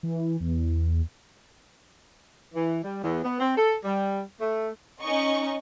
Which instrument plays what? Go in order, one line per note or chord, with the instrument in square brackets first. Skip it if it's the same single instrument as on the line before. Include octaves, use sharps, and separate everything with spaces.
[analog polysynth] E3
E2
[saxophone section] E3
G3
E2
B3
C4
A4
G3
A3
[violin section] C#4 D#4 D#5 C#6